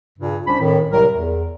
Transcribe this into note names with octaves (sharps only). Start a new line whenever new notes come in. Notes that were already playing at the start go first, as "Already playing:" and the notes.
G2 A#2 C#3
C2 C#4 D4 C5 B5
F2 A2 D#3
C2 A2 C3 F#3 A#4
E2